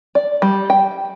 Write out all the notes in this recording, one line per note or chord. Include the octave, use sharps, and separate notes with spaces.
D5
G3
G5